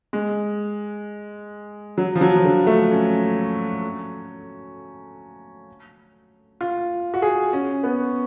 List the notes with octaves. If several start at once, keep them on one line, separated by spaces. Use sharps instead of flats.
G#3
F#3
F3
F#3
F3
D3
A3
C#4
F4
F#4
G#4
C#4
B3